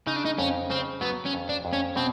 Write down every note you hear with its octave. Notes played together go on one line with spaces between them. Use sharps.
C#3 D#4
D4
D#4
F2 C#4
C#3 C4
F#3 B3
C#4
F2
D4
F2
C#4
B2 C4